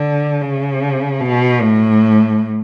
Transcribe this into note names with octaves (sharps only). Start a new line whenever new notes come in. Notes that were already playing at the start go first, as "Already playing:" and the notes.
Already playing: D3
C#3
B2
A2